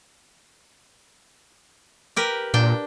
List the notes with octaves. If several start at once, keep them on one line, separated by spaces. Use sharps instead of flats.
G4 A#4 B4
A#2 D4 G5